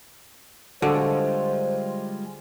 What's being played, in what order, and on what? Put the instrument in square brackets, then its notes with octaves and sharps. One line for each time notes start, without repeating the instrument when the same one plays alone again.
[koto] D3 [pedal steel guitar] G3 G#3 F4 [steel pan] F#4 A4 [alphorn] C5